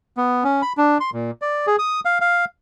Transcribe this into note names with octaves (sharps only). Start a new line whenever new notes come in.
B3
C#4
B5
D4
C6
A#2
D5
G#4
D#6
F5
F5